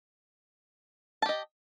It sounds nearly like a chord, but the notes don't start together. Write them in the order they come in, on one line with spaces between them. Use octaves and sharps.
A5 G4 D#5